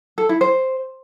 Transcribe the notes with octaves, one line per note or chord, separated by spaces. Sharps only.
A4
E4
C5